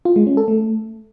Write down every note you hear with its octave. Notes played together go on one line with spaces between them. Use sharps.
F4
G#3
C#4
A4
A3